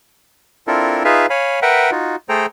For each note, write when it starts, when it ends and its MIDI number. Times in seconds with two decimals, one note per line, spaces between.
0.67 1.03 60
0.67 1.03 62
0.67 1.03 64
0.67 1.03 65
0.67 1.03 69
0.67 1.03 70
1.04 1.26 63
1.04 1.26 65
1.04 1.26 68
1.04 1.26 71
1.04 1.26 76
1.04 1.26 77
1.30 1.60 73
1.30 1.60 77
1.30 1.60 80
1.30 1.60 83
1.62 1.91 70
1.62 1.91 71
1.62 1.91 76
1.62 1.91 78
1.62 1.91 79
1.91 2.16 63
1.91 2.16 65
1.91 2.16 66
2.29 2.46 57
2.29 2.46 68
2.29 2.46 69
2.29 2.46 72
2.29 2.46 79
2.29 2.46 82